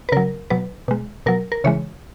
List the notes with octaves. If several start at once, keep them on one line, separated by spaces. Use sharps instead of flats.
B4
C#3 F#3 A#4
B2 F#3 B4
B2 G#3
B2 F#3 A#4
A#4
C#3 E3 G#3 C#5